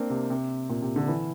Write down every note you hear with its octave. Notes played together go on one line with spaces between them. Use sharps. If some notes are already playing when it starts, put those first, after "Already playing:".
Already playing: A#3 C4 D4
C3
C3
A#2
C3
D3
E3